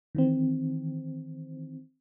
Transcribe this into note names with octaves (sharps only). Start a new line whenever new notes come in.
D#3 E3 C4